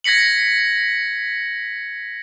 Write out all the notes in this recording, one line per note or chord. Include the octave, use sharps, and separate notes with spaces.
G#6 A#6 B6 C#7 F#7